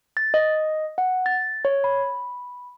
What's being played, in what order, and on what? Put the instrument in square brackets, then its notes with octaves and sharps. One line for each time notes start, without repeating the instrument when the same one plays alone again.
[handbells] A6
D#5
F#5
A6
C#5
B5